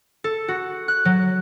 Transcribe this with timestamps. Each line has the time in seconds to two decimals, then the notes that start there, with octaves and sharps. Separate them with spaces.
0.24 A4
0.48 F#4
0.88 F#6
1.05 F#3